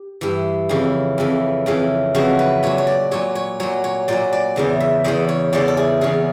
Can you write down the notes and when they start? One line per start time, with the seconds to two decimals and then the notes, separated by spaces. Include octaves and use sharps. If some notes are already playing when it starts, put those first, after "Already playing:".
Already playing: G4
0.21 G2 E3
0.69 F2 C#3 E3
1.18 F2 C#3 E3
1.66 F2 C#3 E3
2.15 F2 C#3 E3 F#4
2.39 B4
2.63 A#2 F#3 C#5
2.78 C#5
2.87 D5
3.11 A#2 F#3 C#5
3.35 C#5
3.60 A#2 F#3 C#5
3.84 C#5
4.08 A#2 F#3 D5
4.33 D5
4.56 E2 C#3 E3
4.80 E5
5.04 E2 C#3 E3 D#5
5.29 C#5
5.53 E2 C#3 E3 D5
5.68 A4
5.77 G#4
6.01 E2 C#3 E3 G#4